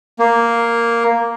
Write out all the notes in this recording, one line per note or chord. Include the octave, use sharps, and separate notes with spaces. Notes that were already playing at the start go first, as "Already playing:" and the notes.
A#3